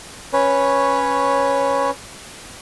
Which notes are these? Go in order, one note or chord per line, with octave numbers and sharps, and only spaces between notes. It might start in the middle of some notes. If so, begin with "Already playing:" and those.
C#4 B4 C#5